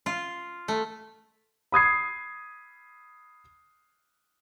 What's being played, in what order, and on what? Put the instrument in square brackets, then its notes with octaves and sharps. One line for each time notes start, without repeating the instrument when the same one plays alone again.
[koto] F4
A3
[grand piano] B5 D#6 G#6 C7